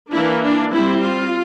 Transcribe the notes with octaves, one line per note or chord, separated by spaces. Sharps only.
E3 A#3 D4 E4
D4
G3 C4 E4
F4